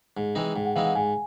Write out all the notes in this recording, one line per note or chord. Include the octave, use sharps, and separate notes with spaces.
G#2
E3 G#3 C4 D#4
G#2 G5
F#5
E3 G#3 C4 D#4 F5
F#5
G#2 G#5